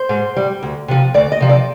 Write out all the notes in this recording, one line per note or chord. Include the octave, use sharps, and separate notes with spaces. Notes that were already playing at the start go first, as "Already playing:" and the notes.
Already playing: C5
G#2
G3
D2
C3 F3
D2 D5
D#5
C3 F3
D5